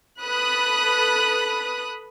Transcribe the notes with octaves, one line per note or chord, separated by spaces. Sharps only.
A4 B4 B5 D#6 F#6